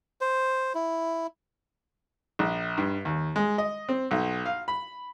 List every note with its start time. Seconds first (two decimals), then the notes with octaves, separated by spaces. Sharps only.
0.21 C5
0.75 E4
2.39 A#1
2.78 G2
3.05 D#2
3.36 G#3
3.58 D#5
3.89 C4
4.11 B1
4.46 F5
4.68 B5